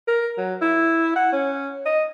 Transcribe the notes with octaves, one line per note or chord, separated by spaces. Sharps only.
A#4
F#3
E4
F#5
C#4
D#5